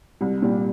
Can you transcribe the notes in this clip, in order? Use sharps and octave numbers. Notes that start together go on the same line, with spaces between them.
C2
A#2 G3